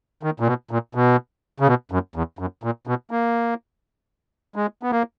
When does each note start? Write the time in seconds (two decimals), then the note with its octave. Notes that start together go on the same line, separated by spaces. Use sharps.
0.23 D#3
0.40 A#2
0.47 B2
0.71 A#2
0.95 B2
1.60 C#3
1.67 B2
1.91 F#2
2.16 E2
2.39 F#2
2.63 A#2
2.87 B2
3.11 A#3
4.56 G#3
4.83 B3
4.92 A#3